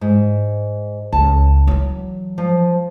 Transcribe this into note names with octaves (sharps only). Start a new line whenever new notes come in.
G#2
C#2 A5
E3 F#3
F3